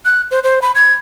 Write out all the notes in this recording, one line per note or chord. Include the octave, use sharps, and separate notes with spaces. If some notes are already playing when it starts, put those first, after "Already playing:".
F#6
C5
C5
B5
G#6